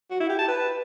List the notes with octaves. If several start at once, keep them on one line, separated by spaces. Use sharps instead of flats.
F#4
E4
G4
A5
B4